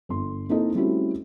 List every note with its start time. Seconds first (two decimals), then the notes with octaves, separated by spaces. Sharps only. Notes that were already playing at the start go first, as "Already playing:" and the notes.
0.09 G1 C6
0.49 A#3 C4 D#4 E4 A4 D#5
0.75 G3 A3 C4 C#4 E4 F#4